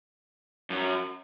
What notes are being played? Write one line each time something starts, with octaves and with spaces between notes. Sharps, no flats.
F#2